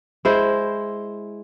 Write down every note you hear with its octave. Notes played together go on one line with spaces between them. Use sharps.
G#3 E4 C5